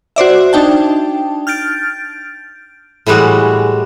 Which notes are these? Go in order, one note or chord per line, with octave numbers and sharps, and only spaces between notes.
F#4 C5 D5 E5
D4 D#4 G5 A5
F6 G6 A6 D7
A2 E3 G3 G#3 F#4